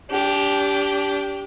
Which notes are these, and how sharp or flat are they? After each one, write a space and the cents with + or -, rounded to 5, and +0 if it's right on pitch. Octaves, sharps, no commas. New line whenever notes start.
D4 -30 G4 +0